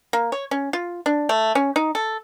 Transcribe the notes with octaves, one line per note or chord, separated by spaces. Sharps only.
A#3
C#5
C#4
F4
D4
A3
C#4
D#4
A4